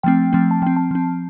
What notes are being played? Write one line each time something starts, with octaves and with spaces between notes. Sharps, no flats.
F3 A3 C4 G5
F3 A3 C4
A5
F3 C4 G5
A5
F3 C4